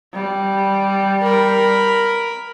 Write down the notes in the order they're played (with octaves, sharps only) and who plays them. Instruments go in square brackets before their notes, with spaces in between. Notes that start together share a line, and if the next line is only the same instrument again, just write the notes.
[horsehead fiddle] G3
[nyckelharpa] A#4 B5